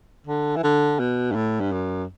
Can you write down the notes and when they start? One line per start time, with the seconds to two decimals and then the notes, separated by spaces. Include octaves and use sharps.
0.27 D3
0.57 E3
0.64 D3
1.00 B2
1.31 G2
1.35 A2
1.60 G2
1.72 F#2